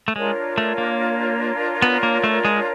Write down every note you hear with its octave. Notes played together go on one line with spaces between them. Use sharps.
A3
G#3 D4 F4 A#4 C#5
A3
A#3
B3
A#3
A3
G#3